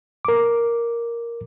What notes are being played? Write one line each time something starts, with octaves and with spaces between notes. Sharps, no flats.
A#4 D6